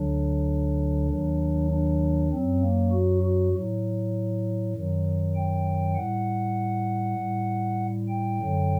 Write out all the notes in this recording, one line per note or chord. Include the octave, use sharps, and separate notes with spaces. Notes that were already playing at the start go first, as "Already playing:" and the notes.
Already playing: D2 D3 F#3 D4
D#2 D#3 F#3
D4
F#2 F#3 C4
A#3
F#4
F#4
A2 F#3
F#2 D#3 F#3
G5
A2 G3 F#5
A2 G3
G5
F#2 D3 F#3